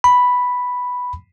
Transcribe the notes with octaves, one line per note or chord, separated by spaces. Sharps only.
B5